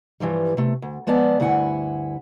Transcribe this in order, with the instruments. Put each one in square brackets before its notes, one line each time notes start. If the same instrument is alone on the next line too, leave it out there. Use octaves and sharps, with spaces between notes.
[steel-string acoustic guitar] G2 E3 F3 G3
C3 A3
D2
F3 G#3 B3 D5 A5
D2 G2 E4 F#5 G#5